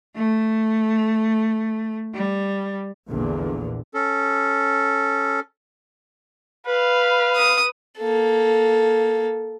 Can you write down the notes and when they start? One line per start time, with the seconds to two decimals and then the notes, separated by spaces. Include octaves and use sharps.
0.16 A3
2.15 G3
3.10 A#1 E2 A#2 D3
3.94 C#4 A4
6.67 B4 F5
7.36 D#6
7.99 A#3 A4